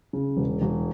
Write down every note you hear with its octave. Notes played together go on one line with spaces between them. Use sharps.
C#3
E1
E1